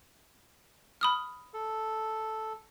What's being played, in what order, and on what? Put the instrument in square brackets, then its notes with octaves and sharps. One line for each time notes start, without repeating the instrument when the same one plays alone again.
[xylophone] B5 D#6 F6
[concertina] A4